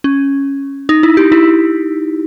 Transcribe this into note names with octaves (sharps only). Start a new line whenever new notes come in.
C#4
D#4
E4
G4
E4